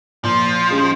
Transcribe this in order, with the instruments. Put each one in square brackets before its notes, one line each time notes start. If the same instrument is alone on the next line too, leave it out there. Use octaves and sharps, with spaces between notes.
[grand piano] A#2 [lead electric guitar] F3
[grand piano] G#3 C#4 G4